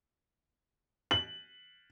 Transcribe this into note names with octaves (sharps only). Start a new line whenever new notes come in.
F#7